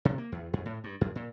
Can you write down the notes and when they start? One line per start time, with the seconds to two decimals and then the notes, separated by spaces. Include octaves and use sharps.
0.05 C3
0.18 A#3
0.32 E2
0.53 F2
0.66 A2
0.84 G2
1.01 F#2
1.15 A#2